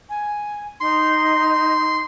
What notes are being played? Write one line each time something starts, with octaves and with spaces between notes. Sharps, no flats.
G#5
D#4 C6